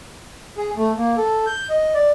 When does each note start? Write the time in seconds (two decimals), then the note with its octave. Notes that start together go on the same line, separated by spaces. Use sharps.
0.57 G#4
0.77 A3
0.97 A#3
1.17 A4
1.46 G6
1.70 D#5
1.94 D5